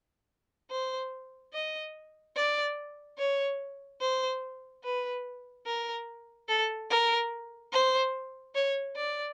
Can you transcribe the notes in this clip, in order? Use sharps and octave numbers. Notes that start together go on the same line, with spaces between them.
C5
D#5
D5
C#5
C5
B4
A#4
A4
A#4
C5
C#5
D5